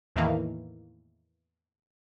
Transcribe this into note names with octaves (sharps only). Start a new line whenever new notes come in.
E2 A2 D#3 E3 A#3